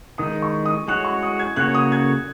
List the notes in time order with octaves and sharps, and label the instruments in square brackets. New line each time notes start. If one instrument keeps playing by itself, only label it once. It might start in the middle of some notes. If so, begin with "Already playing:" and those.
[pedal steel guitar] D#3 G#3 D#4 [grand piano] D#6
[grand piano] C#6
D#6
[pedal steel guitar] G#3 F#4 C#5 [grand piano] F#6
[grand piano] C#6
D#6
G#6
[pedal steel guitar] C#3 A#3 F#4 C#5 [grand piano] F#6
[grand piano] D#6
G#6